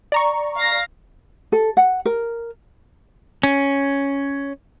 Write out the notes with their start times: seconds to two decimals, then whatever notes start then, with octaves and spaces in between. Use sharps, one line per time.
0.12 D5 A#5 C#6
0.56 F5 A#6
1.52 A4
1.77 F#5
2.05 A#4
3.43 C#4